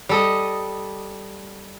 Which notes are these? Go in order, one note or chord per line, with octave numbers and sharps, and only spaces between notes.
G3 A4 D#5